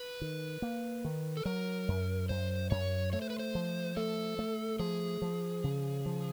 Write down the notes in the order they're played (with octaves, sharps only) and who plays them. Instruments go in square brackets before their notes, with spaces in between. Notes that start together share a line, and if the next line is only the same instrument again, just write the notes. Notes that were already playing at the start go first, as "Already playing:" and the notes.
Already playing: [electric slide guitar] B4
[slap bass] D#3
A#3
D#3
[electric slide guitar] A4
[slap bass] F#3 [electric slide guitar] A#4
[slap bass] F#2
[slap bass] F#2 [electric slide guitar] C5
[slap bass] F#2 [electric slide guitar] C#5
[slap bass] A3 [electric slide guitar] C#5
[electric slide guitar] C5
B4
C5
[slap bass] F3
[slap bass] A3 [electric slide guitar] A4
[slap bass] A3
[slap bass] F3 [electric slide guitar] G#4
[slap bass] F3
C#3
F3